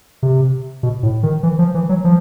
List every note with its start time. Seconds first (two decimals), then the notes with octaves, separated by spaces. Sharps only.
0.23 C3
0.83 B2
1.03 A2
1.23 D#3
1.43 E3
1.59 F3
1.74 E3
1.89 F#3
2.04 F3